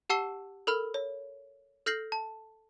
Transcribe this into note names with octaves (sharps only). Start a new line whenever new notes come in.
G4 F#5 A5 E6 C7 G7
A4 A#4 B5 F6
C#5
A4 F6 G6 A#6 C7 F#7
A5